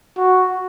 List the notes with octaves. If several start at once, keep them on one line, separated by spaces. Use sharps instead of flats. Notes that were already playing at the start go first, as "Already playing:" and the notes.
F#4